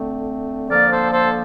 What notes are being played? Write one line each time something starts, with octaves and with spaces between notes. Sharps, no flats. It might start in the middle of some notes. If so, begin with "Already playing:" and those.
Already playing: D3 A3 C4
D3 F3 A#3 A#4 D5
A4 C5
A4 C5